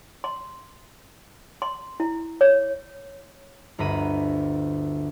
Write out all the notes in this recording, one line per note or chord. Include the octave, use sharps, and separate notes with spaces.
C6
C6
E4
C#5
G1 D2 A#5 B5 D#7